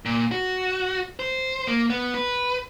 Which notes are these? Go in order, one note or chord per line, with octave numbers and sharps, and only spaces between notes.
A#2
F#4
C5
A#3
B3
B4